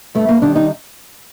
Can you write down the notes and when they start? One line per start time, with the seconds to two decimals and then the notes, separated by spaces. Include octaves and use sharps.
0.15 G2 A3
0.29 A#3
0.42 D#3 G3 D4
0.56 D#4